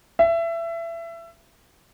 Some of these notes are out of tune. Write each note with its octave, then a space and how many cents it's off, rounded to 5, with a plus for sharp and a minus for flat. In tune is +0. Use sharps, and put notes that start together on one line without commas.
E5 +25